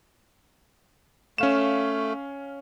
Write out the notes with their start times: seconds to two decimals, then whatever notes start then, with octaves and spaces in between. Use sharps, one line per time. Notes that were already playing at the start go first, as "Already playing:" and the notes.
1.38 A3 C#4 F5 E7